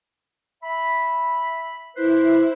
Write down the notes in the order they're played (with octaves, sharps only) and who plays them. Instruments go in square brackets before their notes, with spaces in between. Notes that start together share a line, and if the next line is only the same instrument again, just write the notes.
[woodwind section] E5 B5
[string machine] E4 [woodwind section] B4 C5